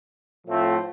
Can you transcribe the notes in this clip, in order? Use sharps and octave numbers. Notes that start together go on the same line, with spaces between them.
A2 F3 A3 C4